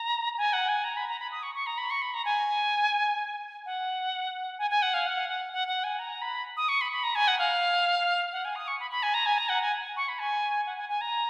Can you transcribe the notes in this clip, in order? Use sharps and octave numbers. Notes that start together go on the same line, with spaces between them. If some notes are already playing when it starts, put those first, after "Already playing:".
Already playing: A#5
G#5
F#5
G#5
A#5
B5
A#5
B5
D#6
C#6
C#6
A#5
B5
C#6
B5
A#5
G#5
F#5
G#5
G#5
F#5
F5
F#5
F#5
F#5
F#5
G#5
A#5
B5
D#6
C#6
B5
B5
A#5
G#5
F#5
F5
F#5
G#5
D#6
C#6
B5
B5
G#5
A#5
G#5
A#5
F#5
G#5
C#6
B5
G#5
F#5
G#5
G#5
A#5